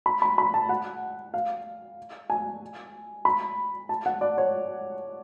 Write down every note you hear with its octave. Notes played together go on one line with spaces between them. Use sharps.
B5
B5
B5
A5
F#5
F5
G#5
B5
A5
F#5
D5
C#5